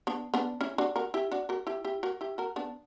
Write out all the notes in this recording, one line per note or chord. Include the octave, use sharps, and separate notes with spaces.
B3 D4
B3 D4
C#4 E4
D4 F#4
F#4 A#4
E4 G4
D4 F#4
F#4 A#4
E4 G4
E4 G4
F#4 A#4
E4 G4
F#4 A#4
B3 D4